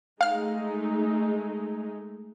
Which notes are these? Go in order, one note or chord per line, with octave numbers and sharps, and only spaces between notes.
G#3 A3 D#4 F5 F6